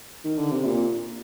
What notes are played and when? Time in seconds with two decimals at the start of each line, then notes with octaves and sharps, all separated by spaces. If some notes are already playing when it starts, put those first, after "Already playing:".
0.25 D#3
0.38 D3
0.52 C3
0.65 A#2